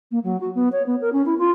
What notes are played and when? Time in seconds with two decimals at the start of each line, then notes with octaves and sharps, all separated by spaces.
0.11 A#3
0.24 F#3
0.41 F#4
0.55 B3
0.72 C#5
0.86 B3
1.01 A#4
1.13 C#4
1.26 E4
1.38 F4